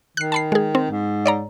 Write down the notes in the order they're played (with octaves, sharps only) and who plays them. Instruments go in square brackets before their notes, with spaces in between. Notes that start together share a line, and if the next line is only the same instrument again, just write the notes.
[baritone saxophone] D#3 [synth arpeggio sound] F#6 C7
[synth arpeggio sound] A5 B5 C7
G#3 G#4
C4
[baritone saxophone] G#2
[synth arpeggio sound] C#5 D5 A#5